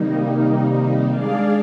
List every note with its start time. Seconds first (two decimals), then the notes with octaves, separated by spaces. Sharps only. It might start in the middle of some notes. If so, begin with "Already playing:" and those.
Already playing: C3 D#3 G3 A#3 D#4
1.10 G#3 D4 G#4 D5 F5